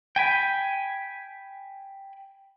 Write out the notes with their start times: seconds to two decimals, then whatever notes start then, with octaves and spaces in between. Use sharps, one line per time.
0.16 G5 G#5 B5